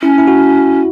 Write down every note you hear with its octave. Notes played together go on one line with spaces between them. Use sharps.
C#4 E4
E4
F#4